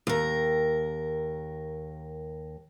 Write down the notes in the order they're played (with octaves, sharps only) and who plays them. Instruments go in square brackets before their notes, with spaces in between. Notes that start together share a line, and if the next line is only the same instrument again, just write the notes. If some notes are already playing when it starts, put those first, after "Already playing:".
[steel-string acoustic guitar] D#2 A#4